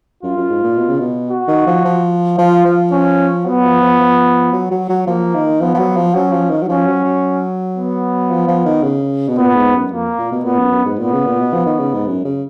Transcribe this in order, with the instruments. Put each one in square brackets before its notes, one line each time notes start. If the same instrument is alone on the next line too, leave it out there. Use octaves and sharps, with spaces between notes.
[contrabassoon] F#2 [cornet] F4
[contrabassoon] F#2
G#2
A#2
B2
C#3
B2
[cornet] F#4
[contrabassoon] D#3
F3
F3
[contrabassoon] F3 [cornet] F4
[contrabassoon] F3
[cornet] C#4
[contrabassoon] F#3 [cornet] B3
[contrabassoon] F3
F3
F3
F#3
F#3
F#3
[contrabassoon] F3 [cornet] A#3
[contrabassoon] D#3
[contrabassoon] F3 [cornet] B3
[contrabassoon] F3
F#3
F3
[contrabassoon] F#3 [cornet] C#4
[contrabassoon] F3
D#3
F#3
[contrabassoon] F3 [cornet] C#4
[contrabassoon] F#3
F#3
[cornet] B3
[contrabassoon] F3
F3
D#3
C#3
B2
[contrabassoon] A#2 [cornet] B3
[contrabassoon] G#2
F#2
[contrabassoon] F2 [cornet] A#3
[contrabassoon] A#2
B2
[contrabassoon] A#2 [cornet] B3
[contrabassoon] F#2
F#2
G#2
[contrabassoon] A#2 [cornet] B3
[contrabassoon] C#3
A#2
B2
F3
D#3
C#3
G#2
F#2
C#3